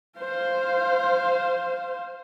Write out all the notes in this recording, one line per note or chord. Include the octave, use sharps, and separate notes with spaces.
C5 F5